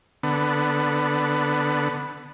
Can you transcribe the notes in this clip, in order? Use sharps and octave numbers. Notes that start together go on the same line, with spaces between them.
D3 B3